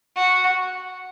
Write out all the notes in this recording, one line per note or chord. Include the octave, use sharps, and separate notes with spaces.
F#4